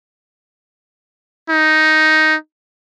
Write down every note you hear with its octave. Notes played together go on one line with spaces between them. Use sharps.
D#4